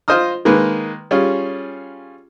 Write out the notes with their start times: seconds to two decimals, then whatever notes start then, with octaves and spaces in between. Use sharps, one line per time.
0.08 F4 C5 D#5 D#6 F6
0.45 D#3 G#3 A#3 B4
1.11 G3 C#4 F4 G#4